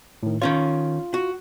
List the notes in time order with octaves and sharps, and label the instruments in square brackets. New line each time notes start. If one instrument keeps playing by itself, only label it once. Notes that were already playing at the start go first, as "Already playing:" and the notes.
[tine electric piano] A2 D#3
[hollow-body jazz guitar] D#3 C#4 C#5 [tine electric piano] F4
[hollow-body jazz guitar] F#4